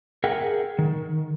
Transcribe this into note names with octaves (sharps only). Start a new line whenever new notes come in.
G#4 A#4 E5 F#5 G5
D#3